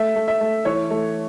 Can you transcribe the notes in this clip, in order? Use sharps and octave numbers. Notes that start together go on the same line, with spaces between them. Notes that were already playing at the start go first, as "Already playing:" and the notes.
Already playing: A3 E5
A3
E5
A3
E3 C#5
A3